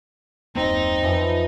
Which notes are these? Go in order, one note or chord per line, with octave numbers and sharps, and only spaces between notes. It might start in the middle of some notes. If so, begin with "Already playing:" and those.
D#1 F#2 A#3 C4 D#4
F2 E3 F3